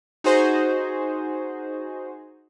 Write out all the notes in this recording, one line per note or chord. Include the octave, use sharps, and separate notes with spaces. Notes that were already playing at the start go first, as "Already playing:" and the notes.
D#4 F#4 G#4 C5